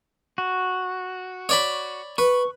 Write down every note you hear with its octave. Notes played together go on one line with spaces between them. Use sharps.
F#4
C#5 D5 B5
B4 C#6